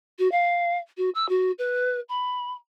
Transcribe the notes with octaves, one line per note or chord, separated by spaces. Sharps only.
F#4
F5
F#4
E6
F#4
B4
B5